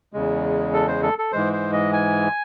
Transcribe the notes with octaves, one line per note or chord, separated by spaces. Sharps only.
E2 C#3 G#3
A4
C5
A4
A4
G#2 E3 G#3 C5
C5
D#5
G#5